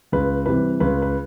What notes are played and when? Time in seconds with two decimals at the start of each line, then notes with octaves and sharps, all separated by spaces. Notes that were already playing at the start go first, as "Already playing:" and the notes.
0.12 C#2 B4
0.46 C3 E3 G3 B4
0.80 C#2 B4
1.02 B4